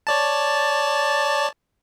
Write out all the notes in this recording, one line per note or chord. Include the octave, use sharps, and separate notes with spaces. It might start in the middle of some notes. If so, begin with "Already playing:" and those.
C#5 D5 A5